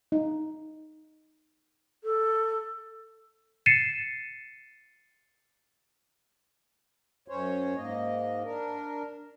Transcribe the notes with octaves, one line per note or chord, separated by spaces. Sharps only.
D#4
A4
A6 C7 C#7 D#7 E7
F#2 C#4 C5 C#5
G#2 A#3 D#5
D4 A#4